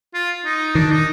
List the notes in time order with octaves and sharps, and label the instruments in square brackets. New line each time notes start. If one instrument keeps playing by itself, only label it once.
[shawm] F4
D#4
[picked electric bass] D#3 [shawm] D4
[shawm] D#4